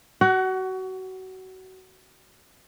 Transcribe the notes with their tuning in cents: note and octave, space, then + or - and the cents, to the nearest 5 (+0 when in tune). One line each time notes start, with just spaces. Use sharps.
F#4 +25 F#5 +0